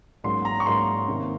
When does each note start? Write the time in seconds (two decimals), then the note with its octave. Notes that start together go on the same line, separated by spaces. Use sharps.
0.24 G#2 F#3 A#3 C#4 C6
0.45 A#5
0.60 C#6
0.66 G#2 F#3 A#3 C#4 C6
1.08 C3 D#3 A#3